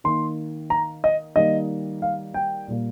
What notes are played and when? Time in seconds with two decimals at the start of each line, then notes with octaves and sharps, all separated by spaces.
0.04 D#3 A#3 C6
0.70 A#5
1.04 D#5
1.36 D#3 G3 A#3 D#5
2.02 F5
2.34 G5
2.68 A#2 G3 A#3